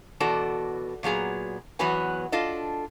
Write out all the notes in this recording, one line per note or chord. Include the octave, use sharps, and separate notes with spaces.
E2 B2 F#4 A4 D5 A5
A#2 F#3 B3 G#4 A#5
E2 F#3 B3 F#4 B4 G#5
D4 F4 A4 D#5